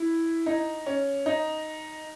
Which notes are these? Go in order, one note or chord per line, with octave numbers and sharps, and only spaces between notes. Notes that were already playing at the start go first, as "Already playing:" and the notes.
Already playing: E4
D#4
C#4
D#4